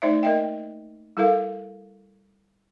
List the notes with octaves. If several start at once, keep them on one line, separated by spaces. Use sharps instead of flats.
A3 D#4 C5 D5 E5
A#3 A#4 D#5 E5 G5
G3 E4 A4 A#4 F5